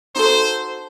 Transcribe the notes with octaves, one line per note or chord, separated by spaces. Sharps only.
D#4 F#4 A4 C5